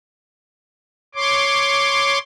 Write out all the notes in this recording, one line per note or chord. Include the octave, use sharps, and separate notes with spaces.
C#5 C6 D6